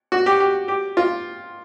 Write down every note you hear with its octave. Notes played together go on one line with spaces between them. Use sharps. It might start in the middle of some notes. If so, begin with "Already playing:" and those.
F#4
G4
G4
G4
F4